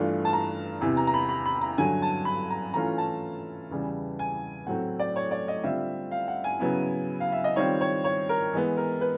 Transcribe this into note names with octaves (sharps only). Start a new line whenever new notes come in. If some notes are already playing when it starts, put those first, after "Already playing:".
Already playing: G2 E3 A3 D4 F4
A5
A#5
E2 C3 E3
A#5
A#5
B5
B5
B5
A#5
G2 D3 F#3 G#5
A5
B5
A#5
E3 A3 C#4 F4 A#5
A5
E2 C#3 E3 G3
G#5
A2 F#3 A3 C4 F#5
D5
C#5
D5
D#5
D3 G3 C4 F4 E5
F5
F#5
G#5
C#3 F#3 B3 E4
F5
E5
D#5
D#3 G3 C4 F4 C#5
C#5
C#5
A#4
E3 G#3 B3
A#4
B4